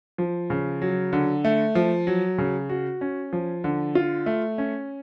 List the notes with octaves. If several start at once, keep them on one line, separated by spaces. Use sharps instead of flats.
F3
C#3
F#3
D3
A3
F3
F#3
C#3
F#4
C#4
F3
D3
F4
A3
C#4